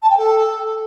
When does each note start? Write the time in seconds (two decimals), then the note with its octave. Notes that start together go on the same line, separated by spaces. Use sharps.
0.02 A5
0.10 G5
0.18 A4